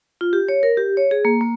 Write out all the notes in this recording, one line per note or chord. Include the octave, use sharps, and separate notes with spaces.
F4
G4
C#5
A#4
G4
C#5
G#4
A#3
A#3